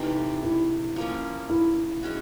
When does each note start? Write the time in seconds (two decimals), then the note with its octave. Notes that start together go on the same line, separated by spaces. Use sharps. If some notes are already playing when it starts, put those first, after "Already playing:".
Already playing: C3 E3 A3 D#4
0.43 E4
0.96 F3 A#3 C#4
1.50 E4
2.03 G#3 C#4 F#4